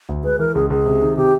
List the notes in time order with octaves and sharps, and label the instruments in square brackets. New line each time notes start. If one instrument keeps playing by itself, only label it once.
[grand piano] D2
[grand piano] G#3 [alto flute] B4
[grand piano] E3 [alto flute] A#4
[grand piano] C#2 [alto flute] G#4
[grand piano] C#2 [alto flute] G#4
[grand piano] C3
D#3
[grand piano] C3 [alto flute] G4